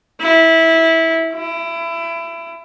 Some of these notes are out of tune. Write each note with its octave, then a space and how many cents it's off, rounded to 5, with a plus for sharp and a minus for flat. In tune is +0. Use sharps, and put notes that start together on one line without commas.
E4 -15
E4 +25